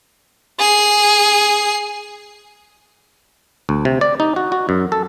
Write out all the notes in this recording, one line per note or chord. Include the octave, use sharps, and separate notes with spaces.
G#4 C7
D2
C3
D5
D#4
F#4
F#4
F#2
A4